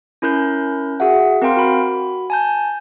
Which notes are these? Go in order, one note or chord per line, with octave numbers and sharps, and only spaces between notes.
C#4 E4 A#4 F#6 G6
F#4 G#4 E5 F#5
C4 A#4 F5 G5 C6
F#4 B5
G#5 A5 G6